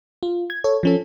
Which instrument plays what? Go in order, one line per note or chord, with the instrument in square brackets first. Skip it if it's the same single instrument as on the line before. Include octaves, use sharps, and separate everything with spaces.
[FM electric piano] F4
G#6
A4 C#5
F3 C#4 A4